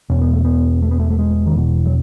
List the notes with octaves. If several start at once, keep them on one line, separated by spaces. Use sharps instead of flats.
E2 B2 C#4
B3
A3
B3
A3
B3
A3
A3
G#3
D#3
E2 B2 E3
F#3